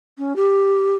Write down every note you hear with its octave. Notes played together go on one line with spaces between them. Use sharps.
C#4
G4